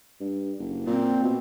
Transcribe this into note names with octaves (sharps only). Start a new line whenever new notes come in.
G2
F#1
A#2 C4
B2